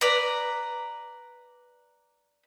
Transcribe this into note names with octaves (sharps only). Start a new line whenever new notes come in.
B4 D5 A#5